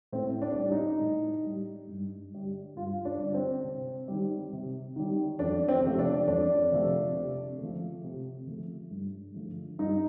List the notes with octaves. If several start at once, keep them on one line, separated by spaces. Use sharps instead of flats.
A2 C4
D4
G3
D#4
A2
G3
G2
D3 G3
G2 F4
D4
D3 G3
C4
C3
D#3 G3
C3
D#3 G3
F2 D4
C4
C3 F3 A3
D4
F2 D4
C3 F3 A3
C3
F3 A3
C3
F3 A3
G2
D3 F3 A3
G2 D#4